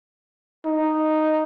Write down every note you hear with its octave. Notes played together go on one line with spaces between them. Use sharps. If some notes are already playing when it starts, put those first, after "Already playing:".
D#4